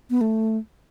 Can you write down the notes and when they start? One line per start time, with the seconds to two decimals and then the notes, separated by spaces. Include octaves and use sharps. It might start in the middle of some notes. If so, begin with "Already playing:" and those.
0.10 B3
0.21 A3